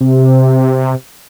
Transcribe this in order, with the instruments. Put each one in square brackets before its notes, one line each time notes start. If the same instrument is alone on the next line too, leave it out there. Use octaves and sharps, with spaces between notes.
[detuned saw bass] C3